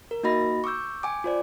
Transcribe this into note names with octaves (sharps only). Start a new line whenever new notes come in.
A#4
A#3 D#4 F#4 D#5 B5 A#6
C#6 D6 E6 G6
G5 G#5 D6
F4 C5 D5